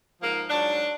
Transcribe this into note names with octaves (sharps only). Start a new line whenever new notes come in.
G#2 F3 A#3
G#2 F#3 D4